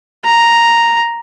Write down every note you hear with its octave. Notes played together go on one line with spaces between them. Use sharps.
A#5